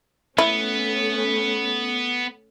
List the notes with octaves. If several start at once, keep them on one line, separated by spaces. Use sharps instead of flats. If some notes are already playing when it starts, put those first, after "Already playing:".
A3 B3 C#4 E4